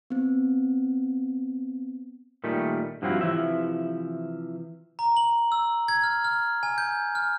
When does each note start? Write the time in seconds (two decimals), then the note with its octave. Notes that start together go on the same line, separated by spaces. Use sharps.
0.10 B3 C4
2.44 A#2 D#3 G3 A3
3.02 G2 F3 F#3 C4 E4 F#4
3.21 C3 E3 F3 E5
4.99 A#5
5.17 F#7
5.52 E6
5.88 G#6
6.03 F6
6.24 F6
6.63 G#5
6.78 G6
7.15 F6